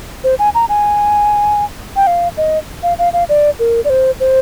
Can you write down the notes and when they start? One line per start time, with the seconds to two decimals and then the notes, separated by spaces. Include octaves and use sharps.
0.24 C5
0.39 G#5
0.55 A#5
0.69 G#5
1.96 G5
2.07 F5
2.37 D#5
2.83 F5
2.98 F5
3.13 F5
3.29 D5
3.59 A#4
3.85 D5
3.90 C5
4.20 C5